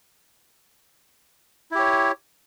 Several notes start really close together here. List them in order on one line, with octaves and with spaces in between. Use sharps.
E4 G4 C#5